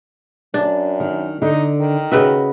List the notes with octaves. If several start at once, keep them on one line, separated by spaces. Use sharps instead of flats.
F#2 D4
D#3
D3 D#4
D#3
C#3 F#4 B4 D#5 E5